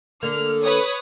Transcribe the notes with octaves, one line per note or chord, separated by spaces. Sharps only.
D3 A#3 F6
B4 C#5 D#6